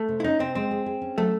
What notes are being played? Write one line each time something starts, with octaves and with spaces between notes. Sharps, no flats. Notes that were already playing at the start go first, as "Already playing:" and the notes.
Already playing: A3
C3
E4
C#4 D#4
C3 C4
G#3 C4
G#4
G#4
C#4
F#3 A3